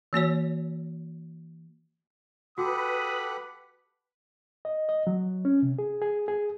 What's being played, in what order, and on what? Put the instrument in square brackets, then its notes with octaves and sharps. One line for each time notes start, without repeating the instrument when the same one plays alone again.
[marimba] E3 A#3 F#4 C#5
[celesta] F#4 [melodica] G4 A4 F#5 [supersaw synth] B4 B5 [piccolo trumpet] D#6
[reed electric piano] D#5
D#5
F#3
C#4
C3
G#4
G#4
G#4